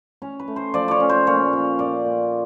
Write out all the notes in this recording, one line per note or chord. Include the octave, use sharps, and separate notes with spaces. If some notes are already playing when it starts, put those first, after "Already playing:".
C#4 C#5
B4
A3
C5
F3 D5
C#5 D5
C#4
C5
A#2 C#5
A#2 C#5
A#2 D5
A#2